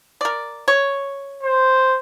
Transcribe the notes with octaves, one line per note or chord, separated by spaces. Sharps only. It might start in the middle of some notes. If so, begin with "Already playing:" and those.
A#4 D5
C#5
C5